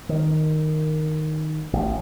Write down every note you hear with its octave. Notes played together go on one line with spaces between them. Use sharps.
D#3
A1